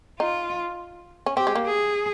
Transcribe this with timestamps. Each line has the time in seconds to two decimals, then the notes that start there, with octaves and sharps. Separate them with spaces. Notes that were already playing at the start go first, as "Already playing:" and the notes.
0.20 D#4 F4
1.26 C#4
1.36 C4 G4
1.47 G#3
1.55 A#3
1.66 G#4